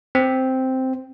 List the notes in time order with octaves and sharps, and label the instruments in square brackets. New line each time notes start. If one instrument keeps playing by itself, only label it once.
[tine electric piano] C4